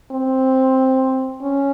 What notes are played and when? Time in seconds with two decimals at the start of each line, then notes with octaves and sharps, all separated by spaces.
0.11 C4
1.42 C#4